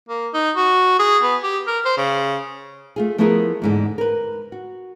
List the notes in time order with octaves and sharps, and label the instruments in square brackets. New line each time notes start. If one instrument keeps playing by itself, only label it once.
[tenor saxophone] A#3
D#4
F#4
G#4
B3
G4
A#4
C5
C#3
[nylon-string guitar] A3 F4 G#4
F3 A3 B3 E4 G#4 A#4
E2 G#2 D3
A#4 B4
F#4